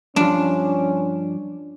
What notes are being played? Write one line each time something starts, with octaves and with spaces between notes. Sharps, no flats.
G2 F3 C#4 D4